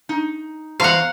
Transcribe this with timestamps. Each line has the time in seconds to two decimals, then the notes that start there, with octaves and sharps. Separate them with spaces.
0.09 D#4
0.80 E2 C5 F5 F#5 A#5